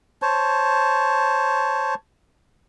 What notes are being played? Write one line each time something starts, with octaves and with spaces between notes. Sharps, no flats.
C5 C#5 A5